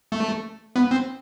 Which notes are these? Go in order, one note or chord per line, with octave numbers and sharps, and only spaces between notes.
A3
B3
C4